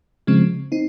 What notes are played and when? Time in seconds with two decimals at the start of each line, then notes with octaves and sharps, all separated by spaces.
0.27 C#3 F3 G#3 C4
0.72 C4 D#4